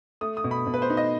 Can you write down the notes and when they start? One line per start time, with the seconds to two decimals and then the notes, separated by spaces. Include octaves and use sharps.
0.21 A3 D#6
0.37 D#6
0.44 B2
0.51 B5
0.67 B2
0.74 B4
0.82 C5
0.90 D#4
0.97 D#5